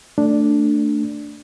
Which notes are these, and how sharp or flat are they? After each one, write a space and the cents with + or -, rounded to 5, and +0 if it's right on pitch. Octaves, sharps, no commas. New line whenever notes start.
A3 +20 D4 +0